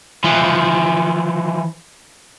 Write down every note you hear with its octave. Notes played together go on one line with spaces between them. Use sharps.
E3 F3